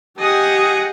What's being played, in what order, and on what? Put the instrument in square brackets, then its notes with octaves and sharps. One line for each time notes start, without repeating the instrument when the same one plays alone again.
[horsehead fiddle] G4 [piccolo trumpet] G#4 [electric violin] D#5 F#5